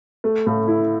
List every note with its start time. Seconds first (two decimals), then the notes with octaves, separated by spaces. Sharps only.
0.24 A3
0.46 A2
0.68 E4